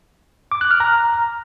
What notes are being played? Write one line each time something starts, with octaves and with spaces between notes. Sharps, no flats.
D6
F#6
F6
A#5